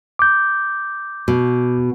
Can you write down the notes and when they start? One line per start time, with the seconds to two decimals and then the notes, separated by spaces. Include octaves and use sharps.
0.19 D6 G6
1.28 B2